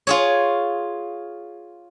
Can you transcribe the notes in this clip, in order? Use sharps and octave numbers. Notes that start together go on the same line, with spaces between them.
F4 G#4 C#5